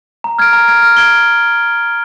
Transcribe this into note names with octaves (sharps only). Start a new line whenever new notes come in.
A#5
F6 G#6 D7
A#5
F6 G#6 D7
F6
G#6 D7 G7